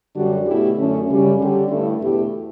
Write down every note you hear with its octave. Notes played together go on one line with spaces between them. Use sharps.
F#2 D3 G3 D4 F#4
B2 A3 E4 G4
F#2 D3 A3 C#4
F#2 C#3 G3 C#4
D3 G3 C#4 G4
G2 D3 A3 E4
E2 B2 A3 E4 G4